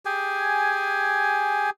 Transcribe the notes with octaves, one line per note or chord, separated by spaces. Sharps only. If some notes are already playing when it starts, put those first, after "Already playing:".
G4 G#4 G#5